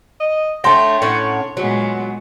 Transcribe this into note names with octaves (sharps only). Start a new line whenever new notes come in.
D#5
A3 D4 C#5 G5 A5 C6 A#6
A2 C#4 F#5
A#2 F#3 G#3 B3